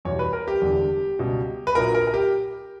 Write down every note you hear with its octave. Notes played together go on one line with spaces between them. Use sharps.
E2 B2 G3 C#5
B4
A#4
G4
E1 E2 D3 G3
C#2 B2 G3
B4
A#1 A#2 F#3 A#4
A#4
A#4
G4